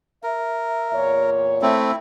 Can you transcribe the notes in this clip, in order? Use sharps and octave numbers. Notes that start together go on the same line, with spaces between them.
A#4 E5
E2 A#2 C#5
A3 C4 E4